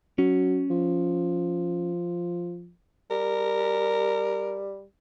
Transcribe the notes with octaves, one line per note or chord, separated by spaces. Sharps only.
F#3 C#4
F3
G3 A#4